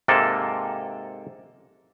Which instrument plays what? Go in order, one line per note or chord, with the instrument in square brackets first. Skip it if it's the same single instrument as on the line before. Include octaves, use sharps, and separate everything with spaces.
[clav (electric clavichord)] G#2 C3 A#3 A4 A5